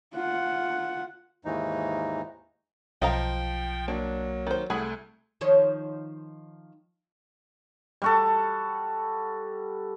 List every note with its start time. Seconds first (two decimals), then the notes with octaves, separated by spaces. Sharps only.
0.14 F4 F#5
1.45 D#2 G#2 E3 D#4
3.02 B1 F3 D#5 F5 G5 A#5
3.88 F#3 A#3 D4
4.47 D#3 C5
4.70 C2 A3 G#4 F#5 B5
5.41 D#3 F3 C#5
8.02 G3 F#4 A4